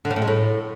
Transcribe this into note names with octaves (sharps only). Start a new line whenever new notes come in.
D3
C#3
A2
G#3
A2